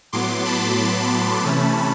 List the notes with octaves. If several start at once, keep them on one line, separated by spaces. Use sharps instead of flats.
A2 F#3 B3 C6 D6
A5 B5
C3 E3 A3 C#4